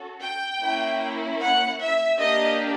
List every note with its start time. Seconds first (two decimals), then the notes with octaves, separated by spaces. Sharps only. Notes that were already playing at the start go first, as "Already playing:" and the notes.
Already playing: C#4 F#4 A4
0.20 G5
0.60 A#3 C#4 E4
1.40 F#5
1.80 E5
2.19 A#3 D4 G4 D#5